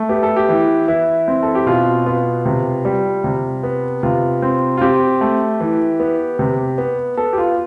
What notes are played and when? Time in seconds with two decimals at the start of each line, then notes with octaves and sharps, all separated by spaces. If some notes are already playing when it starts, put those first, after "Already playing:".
Already playing: A3
0.09 B3 G4
0.23 A4
0.36 G4
0.49 E3
0.88 E3 E4
1.28 C4
1.43 A4
1.55 G4
1.66 B2 F4
2.06 B3 F4
2.46 C3
2.85 G3
3.24 C3
3.63 B3
4.03 C3 F4
4.42 C4
4.77 F4
4.81 C4 G4
5.21 A3
5.60 E3
6.00 B3
6.39 C3
6.78 B3
7.17 B3 A4
7.33 G4
7.38 F4